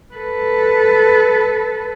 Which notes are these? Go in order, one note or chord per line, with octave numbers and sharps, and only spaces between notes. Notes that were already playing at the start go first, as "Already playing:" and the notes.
A4 B4